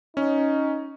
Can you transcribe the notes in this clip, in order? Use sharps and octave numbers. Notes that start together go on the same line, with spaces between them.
C#4 D#4